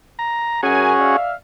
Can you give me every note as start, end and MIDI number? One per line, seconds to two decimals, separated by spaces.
0.19 0.61 82
0.63 0.92 42
0.63 1.16 61
0.63 1.16 66
0.63 1.16 68
0.63 0.92 70
0.63 0.92 80
1.00 1.35 74
1.00 1.35 76
1.00 1.35 77